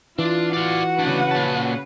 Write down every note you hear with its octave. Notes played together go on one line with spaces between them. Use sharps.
E3 D4 F4
F#4 D5 F5 F#5
D2 C#3 D4 B4
A#2 A5